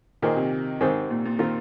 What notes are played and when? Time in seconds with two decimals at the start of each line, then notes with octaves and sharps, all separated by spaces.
0.22 A#2 D#3 A#3 G#4 C5
0.36 C3
0.81 G#2 D#3 C4 G#4 C5
1.10 A#2
1.25 A#2
1.39 D#3 C4 F4 A#4